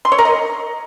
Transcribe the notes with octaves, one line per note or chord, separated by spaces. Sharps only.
C6
C#5
A#4
D#5